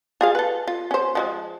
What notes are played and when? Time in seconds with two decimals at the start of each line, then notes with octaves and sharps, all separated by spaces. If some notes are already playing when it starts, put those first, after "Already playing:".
0.21 F4 G#4 F5
0.35 A4 B4
0.68 F4
0.91 C#4 C5
1.15 F3 G3 G#3